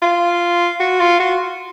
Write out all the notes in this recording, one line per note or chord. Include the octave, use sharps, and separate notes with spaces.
F4
F#4
F4
F#4